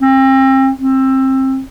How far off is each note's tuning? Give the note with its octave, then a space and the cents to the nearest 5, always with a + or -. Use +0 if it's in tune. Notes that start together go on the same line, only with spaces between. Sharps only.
C4 +35
C4 +25